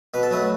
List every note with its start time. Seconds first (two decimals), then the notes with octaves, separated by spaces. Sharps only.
0.14 B2 B4
0.23 A4
0.31 F#3 A3 B4